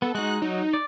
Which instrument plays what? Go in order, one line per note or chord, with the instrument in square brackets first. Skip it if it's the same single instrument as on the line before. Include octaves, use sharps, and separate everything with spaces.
[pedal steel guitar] B3 [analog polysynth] A4
[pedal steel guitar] G#3 D#4 [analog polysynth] F#4 F#6
[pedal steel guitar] F#3 [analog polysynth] D#4
[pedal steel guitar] D5